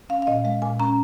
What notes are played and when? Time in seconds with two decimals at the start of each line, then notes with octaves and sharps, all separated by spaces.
0.09 C#4 F5
0.22 F5
0.27 A#2 D#5
0.44 G#3 F5
0.62 A#2 G#5
0.80 C#4 A#5